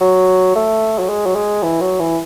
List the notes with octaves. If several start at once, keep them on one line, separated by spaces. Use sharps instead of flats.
F#3
A3
F#3
G#3
F#3
G#3
E3
F#3
E3